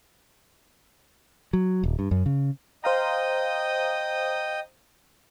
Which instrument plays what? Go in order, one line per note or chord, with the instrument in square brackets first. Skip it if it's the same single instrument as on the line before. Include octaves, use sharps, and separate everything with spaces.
[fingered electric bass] F#3
D#1
G2
F#2
C#3
[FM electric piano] C5 F5 A#5 [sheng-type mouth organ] D#5 G5 D#6